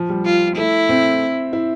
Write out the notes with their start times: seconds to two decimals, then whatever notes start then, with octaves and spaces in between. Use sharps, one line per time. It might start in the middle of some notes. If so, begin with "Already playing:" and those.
Already playing: F3
0.09 G3
0.25 F4
0.57 A3 E4
0.89 C4
1.53 E4